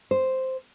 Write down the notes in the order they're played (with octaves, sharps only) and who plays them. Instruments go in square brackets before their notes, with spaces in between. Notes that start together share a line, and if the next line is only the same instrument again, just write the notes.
[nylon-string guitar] C5